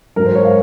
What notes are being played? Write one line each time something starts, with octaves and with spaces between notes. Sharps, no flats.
G#2 F#3 A#4
C5
C#5
F5